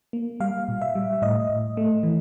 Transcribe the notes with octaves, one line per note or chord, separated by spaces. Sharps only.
A#3
G3 F5
A#2
E5
G3
A2 D#5
A2
A3
E3